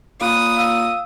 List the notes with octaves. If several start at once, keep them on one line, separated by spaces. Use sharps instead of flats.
A#2 F5 B5 D#6 F#6
F5 E6